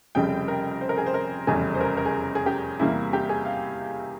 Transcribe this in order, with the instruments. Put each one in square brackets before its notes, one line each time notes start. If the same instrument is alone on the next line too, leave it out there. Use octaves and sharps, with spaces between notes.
[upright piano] F1 F2 C#3 G3 G5
A#4
C5
A#4
G#4
C5
A#4
F1 E2 C#3 G3 G#4
C5
A#4
A#4
G#4
G#4
G4
E2 C3 G3 A#3 E4
G4
G#4
F5